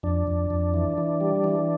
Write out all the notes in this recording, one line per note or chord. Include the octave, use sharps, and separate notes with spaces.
F2 D4
F2
F2
E3
E3
G3
E3